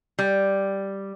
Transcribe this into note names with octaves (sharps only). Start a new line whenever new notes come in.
G3